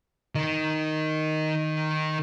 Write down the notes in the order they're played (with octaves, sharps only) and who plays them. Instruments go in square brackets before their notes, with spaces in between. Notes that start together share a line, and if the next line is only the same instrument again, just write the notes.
[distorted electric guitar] D#3 D#4